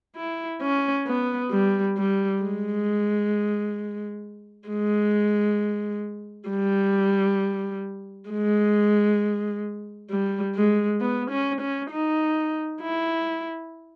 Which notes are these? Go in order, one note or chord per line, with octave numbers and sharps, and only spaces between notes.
E4
C#4
B3
G3
G3
G#3
G#3
G3
G#3
G3
G#3
B3
C#4
C#4
D#4
E4